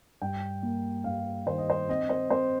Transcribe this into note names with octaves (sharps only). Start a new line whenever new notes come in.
G2 G5
A#3
G2 F5
D#3 C5
D#5
C5
C4 D#5
C5
C4 C5